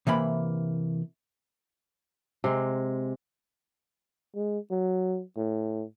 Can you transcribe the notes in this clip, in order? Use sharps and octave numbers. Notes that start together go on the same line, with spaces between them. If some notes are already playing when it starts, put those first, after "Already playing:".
C3 E3 A#3 B5
C3 G#3
G#3
F#3
A2